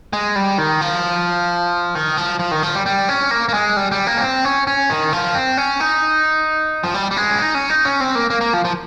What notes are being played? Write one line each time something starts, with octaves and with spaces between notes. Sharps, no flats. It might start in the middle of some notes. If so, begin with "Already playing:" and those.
G#3
G3
D#3
F3
D#3
F3
F3
D#3
F3
G3
G3
C#4
A#3
A#3
G#3
G3
G3
A#3
C#4
C4
C#4
C#4
D#3
F3
C4
C#4
D#4
F3
G3
G3
G#3
C#4
D#4
C#4
D#4
C#4
C4
A#3
A#3
A#3
F3
F3